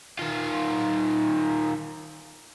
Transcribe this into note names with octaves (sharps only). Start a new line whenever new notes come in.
D#3 F4